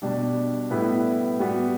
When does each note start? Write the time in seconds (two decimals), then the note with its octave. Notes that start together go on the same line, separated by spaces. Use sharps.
0.02 B2 G3 D4
0.71 A2 G3 B3 E4 B4
1.39 G3 B3 F#4